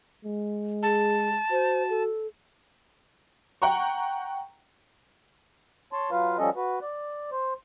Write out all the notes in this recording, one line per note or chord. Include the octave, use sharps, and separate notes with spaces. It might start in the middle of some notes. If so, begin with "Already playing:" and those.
G#3
G#4 A5
F#4 C5
A4
F#5 G5 A#5 C#6
C#5 A5 C6
F#3 F4 B4 F5
F3 G3 C#4 A4 D#5
F#4 B4
D5
C5